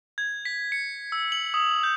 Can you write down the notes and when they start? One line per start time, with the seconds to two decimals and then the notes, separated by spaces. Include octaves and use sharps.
0.18 G#6
0.45 B6
0.72 C#7
1.12 E6
1.32 F#7
1.54 D#6
1.83 G6